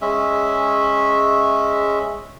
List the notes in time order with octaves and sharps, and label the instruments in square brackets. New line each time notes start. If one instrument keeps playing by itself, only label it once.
[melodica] G#3 C#4 E5